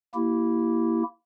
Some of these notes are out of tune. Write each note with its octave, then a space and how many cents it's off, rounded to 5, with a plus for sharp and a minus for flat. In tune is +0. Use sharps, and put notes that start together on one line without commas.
A#3 +0 E4 +0 G4 -20